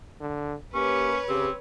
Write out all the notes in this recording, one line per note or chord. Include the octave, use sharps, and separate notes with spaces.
D3
A#3 C#4 G4 B4 C#5
C#3 C4 G4